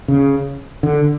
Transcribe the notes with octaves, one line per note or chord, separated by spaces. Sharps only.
C#3
D3